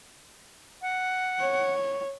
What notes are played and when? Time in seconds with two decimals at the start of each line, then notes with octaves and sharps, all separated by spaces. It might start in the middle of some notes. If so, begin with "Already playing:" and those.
0.82 F#5
1.40 C#5